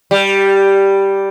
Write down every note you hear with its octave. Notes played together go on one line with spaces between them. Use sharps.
G3